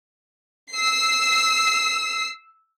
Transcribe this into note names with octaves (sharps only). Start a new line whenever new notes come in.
E6 C7